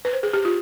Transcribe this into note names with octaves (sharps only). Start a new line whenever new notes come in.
B4
C5
G#4
G4
F4